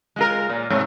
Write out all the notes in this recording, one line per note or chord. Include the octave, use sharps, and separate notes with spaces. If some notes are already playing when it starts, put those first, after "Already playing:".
G#3 F4 A#4
A#2
G#2 C3 A3